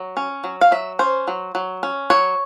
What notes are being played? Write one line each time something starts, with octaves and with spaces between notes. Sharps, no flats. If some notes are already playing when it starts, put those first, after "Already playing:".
Already playing: F#3
C#4
F#3
F5
F#3 E5
C#4 C5
F#3
F#3
C#4
F#3 C#5